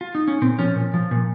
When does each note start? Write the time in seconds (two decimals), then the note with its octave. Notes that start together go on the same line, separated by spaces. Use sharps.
0.01 F4
0.15 D#4
0.28 C#4
0.42 A#2 C4
0.59 F3 C#4
0.76 A#2
0.94 F3
1.11 A#2